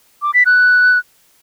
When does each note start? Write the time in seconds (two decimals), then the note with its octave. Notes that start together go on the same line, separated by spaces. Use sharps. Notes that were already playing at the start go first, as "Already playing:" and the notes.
0.22 D6
0.34 B6
0.46 F#6